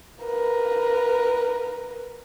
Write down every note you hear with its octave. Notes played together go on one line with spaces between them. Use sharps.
A#4 B4